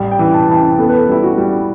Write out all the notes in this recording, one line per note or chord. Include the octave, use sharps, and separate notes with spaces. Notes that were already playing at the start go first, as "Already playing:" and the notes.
Already playing: A1 G3
G5
E3
A5
E3 A5
G5
B3 A4
B4
A4
G3 E4
F#4
G3